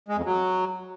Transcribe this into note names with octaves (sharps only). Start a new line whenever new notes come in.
G#3
F2
F#3